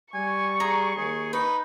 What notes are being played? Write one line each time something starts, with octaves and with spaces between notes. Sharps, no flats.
G3 G#5 C#6
G#4 A#5
D#2 G#4
D#4 B4